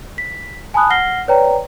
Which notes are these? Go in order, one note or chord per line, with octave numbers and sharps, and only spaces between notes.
B6
G#5 A5 B5 D#6 F#6
F#5 F6 A#6 C7 G7
B4 C#5 D5 G5 A#5